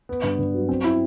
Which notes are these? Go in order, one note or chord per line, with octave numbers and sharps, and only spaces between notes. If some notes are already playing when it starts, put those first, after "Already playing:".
B3
G2
G2
F#3
C4
E4